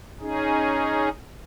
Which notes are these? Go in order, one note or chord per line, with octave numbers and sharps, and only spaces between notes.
C#4 D#4 G#4